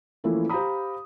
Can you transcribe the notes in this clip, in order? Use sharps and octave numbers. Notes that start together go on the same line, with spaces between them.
E3 F3 A3 A#3 C#4 E4
G4 C5 F5 A#5 B5 D#6